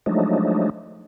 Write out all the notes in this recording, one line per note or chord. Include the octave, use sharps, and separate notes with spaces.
F3 F#3 G#3 A3 D4 D#4